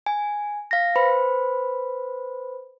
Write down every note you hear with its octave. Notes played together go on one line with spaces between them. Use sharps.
G#5
F5 A#6
B4 C5 B5